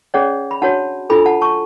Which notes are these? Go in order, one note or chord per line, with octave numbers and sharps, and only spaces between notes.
C#4 G#4 C#5 D5 F#5
B5
D4 F#4 C#5 F#5 A5
D4 F4 A4 G#5 B5
F#5 A5
A5 C#6